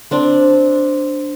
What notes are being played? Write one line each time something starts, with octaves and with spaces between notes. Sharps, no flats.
C4 D4